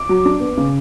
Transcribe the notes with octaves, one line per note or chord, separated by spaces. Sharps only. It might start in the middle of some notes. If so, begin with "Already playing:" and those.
Already playing: D6
F#3
D4
B3
C#3